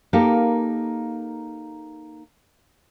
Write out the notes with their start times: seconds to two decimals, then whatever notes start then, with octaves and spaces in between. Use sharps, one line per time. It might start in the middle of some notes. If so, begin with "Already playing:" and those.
0.13 A#3 D#4 G4 A4 A#4 F5